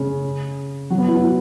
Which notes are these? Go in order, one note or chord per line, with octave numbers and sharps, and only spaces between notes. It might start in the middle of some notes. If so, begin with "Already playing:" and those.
Already playing: C#3
F#3
B3
E4
F#4
E4